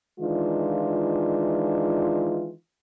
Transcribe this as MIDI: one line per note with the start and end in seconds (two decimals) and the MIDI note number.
0.20 2.51 51
0.20 2.51 52
0.20 2.51 56
0.20 2.51 62
0.20 2.51 65